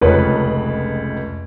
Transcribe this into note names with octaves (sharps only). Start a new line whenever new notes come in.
F1 C#2 C#3 B4 C#5